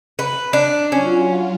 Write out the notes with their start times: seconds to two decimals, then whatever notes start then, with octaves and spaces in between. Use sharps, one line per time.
0.19 B4
0.53 D4
0.92 F#3 C#4 F4